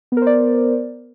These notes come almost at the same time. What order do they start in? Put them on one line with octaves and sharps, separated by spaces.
B3 A#4 C5 D5